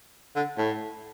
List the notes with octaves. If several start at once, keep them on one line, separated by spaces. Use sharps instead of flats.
D3
A2